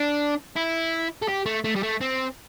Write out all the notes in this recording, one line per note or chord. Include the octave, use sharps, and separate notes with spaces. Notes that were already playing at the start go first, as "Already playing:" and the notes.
Already playing: D4
E4
A4
G4
A3
A3
G3
A3
C4